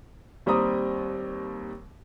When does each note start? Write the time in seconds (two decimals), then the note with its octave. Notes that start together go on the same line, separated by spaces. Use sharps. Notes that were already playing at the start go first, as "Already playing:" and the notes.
0.46 D#2 G3 C4 A#5 D#6